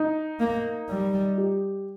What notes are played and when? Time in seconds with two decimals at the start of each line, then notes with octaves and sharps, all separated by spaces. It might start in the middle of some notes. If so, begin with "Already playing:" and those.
Already playing: D#4
0.40 A#3
0.89 G3
1.38 G4